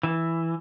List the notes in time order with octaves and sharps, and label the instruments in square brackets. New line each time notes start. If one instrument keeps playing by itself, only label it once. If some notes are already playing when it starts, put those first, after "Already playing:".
[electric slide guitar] E3